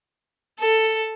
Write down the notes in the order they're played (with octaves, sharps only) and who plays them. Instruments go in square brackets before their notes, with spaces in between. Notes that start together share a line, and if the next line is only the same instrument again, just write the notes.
[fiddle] A4